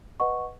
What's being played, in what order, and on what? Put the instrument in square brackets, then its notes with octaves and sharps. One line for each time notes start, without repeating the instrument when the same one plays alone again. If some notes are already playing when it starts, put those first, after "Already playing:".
[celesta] B4 D#5 F#5 C#6